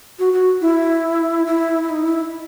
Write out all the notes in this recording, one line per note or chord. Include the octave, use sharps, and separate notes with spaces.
F#4
F#4
E4
E4
E4
D#4
E4